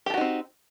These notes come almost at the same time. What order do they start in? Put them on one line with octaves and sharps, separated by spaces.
G4 A4 F#4 D#4 C4